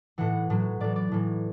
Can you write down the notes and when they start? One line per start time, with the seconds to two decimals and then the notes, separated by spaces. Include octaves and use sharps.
0.18 A2 E3 F#5
0.50 A2 F#3
0.80 A2 E3 D5
0.96 D5
1.12 A2 E3